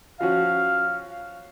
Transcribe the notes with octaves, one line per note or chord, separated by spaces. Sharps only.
F3 C#4 F#4 F5